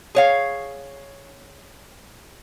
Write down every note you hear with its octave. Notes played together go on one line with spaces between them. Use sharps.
G#4 C#5 F5